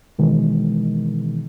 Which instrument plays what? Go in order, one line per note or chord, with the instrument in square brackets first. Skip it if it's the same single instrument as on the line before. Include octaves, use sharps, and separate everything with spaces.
[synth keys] B2 D#3 E3 G#3